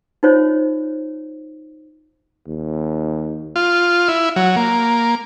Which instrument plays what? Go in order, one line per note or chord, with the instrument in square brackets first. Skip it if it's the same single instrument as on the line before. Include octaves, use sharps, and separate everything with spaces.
[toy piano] D#4 F4 C5 C#5 D#5
[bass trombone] D#2
[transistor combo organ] F4
E4
F#3
A#3